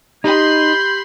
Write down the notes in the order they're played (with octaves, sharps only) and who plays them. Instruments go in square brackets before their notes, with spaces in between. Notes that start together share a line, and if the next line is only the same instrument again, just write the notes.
[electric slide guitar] D#4 [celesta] G4 [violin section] B5 C6 [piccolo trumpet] G6